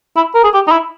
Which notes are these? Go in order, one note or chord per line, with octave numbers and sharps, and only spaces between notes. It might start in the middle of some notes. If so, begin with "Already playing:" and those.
E4
A#4
G#4
G4
D#4
E4